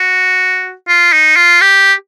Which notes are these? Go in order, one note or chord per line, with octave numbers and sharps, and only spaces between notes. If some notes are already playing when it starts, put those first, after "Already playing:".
Already playing: F#4
F4
D#4
F4
G4